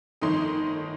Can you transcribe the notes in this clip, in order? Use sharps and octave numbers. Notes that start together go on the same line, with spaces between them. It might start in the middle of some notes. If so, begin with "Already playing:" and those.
G1 F2 D#3 A3 D#4 C6 D#6